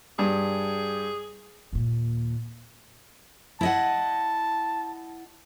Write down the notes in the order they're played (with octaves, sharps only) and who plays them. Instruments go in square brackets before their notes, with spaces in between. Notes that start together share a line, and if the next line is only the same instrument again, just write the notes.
[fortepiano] G2 [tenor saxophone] G#4
[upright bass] D#2 A#2
[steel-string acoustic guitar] E4 D#5 F#5 [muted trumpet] A5